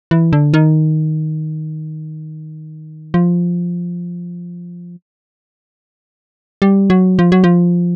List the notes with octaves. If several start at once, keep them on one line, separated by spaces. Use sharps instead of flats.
E3
D3
D#3
F3
G3
F#3
F3
F#3
F3